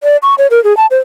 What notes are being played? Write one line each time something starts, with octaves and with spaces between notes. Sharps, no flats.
D5
C#6
C#5
A#4
G#4
A5
C5